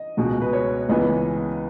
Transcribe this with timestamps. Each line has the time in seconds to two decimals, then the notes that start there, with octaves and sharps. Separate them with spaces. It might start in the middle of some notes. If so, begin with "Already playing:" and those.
Already playing: D#5
0.17 C#2 B2 G#3
0.42 B4
0.53 C#5
0.89 C#2 C#3 E3 G#3 B3 D#5